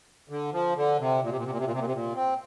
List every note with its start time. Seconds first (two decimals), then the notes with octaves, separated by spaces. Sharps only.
0.29 D3
0.53 F3
0.76 D3
0.99 C3
1.23 A#2
1.30 C3
1.37 A#2
1.44 C3
1.51 A#2
1.58 C3
1.65 A#2
1.72 C3
1.79 A#2
1.86 C3
1.93 A#2
2.16 C4